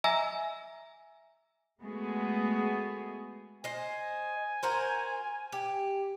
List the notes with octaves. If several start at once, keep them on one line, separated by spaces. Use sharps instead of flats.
D#5 E5 G#5 A#5 E6
G#3 A3 B3 F#4 G#4
C5 D#5 G#5
F#4 A#4 C5
G4